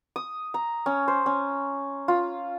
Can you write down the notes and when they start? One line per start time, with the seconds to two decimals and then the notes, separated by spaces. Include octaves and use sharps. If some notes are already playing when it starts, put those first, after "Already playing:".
0.16 D#6
0.54 A#5
0.86 C#4
1.08 C5
1.26 C#4
2.08 F4